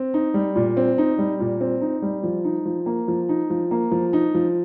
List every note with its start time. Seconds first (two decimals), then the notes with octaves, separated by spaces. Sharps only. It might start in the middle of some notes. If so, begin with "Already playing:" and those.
Already playing: C4
0.14 D#4
0.34 G3
0.56 A#2
0.77 C4
0.98 D#4
1.18 G3
1.40 A#2
1.61 C4
1.81 D#4
2.02 G3
2.23 F3
2.44 D#4
2.66 F3
2.86 A#3
3.08 F3
3.29 D#4
3.50 F3
3.71 A#3
3.92 F3
4.13 D#4
4.35 F3